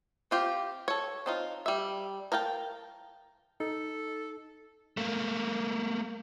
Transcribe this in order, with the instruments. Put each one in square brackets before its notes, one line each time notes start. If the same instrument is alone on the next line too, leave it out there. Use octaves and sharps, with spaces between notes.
[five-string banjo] C4 F4 G4
A4 C#5
C4 D#4 F4
G3 E5
A#4 F5 G5 A5
[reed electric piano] D#4 [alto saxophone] A4
[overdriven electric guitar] A3 A#3